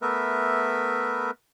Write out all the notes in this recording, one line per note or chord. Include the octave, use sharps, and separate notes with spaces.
A3 B3 A#4 B4 E5